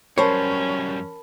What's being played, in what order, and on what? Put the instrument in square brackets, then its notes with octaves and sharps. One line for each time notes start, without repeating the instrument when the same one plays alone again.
[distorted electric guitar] F#2 G3 [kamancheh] C#4 [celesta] A#4 A5 B5 [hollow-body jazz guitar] C5 C#5